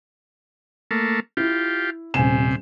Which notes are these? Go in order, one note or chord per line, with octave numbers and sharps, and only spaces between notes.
A3 A#3
E4 F4 G4
D#1 C3 G#5 E7